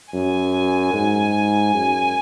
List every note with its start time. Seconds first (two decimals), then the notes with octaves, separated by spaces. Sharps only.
0.14 F#2 G#5
0.93 G#2
1.74 F#2